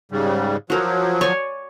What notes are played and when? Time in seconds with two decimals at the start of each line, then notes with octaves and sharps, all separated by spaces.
0.12 G#2 C#3 G3
0.70 F3 F#3 F#4 A#4
1.21 C#5 D5 G#5